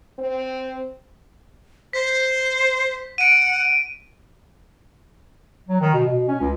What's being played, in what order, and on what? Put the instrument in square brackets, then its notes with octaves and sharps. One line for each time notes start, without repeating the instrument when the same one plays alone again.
[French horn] C4
[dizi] C5 [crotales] B6
[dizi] F#5 [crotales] D7 D#7
[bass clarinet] F#3
D#3
B2
B2
C#4
C#2